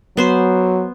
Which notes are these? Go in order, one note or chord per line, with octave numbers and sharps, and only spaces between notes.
F#3 B3 C5 C6